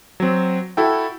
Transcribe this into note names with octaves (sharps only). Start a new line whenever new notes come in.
F#3 C4
E4 F#4 A4 G5